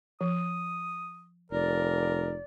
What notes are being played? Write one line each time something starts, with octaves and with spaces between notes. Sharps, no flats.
F3 D#6
F1 A#4 D5